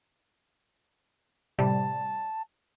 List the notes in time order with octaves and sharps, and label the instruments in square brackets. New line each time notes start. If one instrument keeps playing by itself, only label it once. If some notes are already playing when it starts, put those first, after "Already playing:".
[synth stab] A2 C3 G3 [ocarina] A5